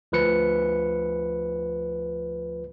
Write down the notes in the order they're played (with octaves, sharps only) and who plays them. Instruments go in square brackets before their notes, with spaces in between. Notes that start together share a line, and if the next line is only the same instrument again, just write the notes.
[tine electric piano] D2 F3 B4 C#7